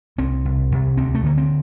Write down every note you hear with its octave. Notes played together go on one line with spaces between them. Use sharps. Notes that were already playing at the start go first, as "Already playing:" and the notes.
C2 C4
C2
C2
D2 C4
A3
D3 A#3
C4